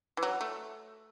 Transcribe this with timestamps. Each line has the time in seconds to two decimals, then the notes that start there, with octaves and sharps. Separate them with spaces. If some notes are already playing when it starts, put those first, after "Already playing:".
0.17 E3
0.23 F#3
0.41 A3